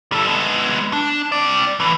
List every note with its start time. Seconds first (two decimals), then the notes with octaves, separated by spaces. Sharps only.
0.12 G3 A4
0.27 G#3 B3
0.93 D4
1.32 C4 D5
1.80 A2 E3